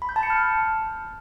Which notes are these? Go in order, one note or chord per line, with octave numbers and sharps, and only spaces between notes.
B5
G6
A5
C#7
F6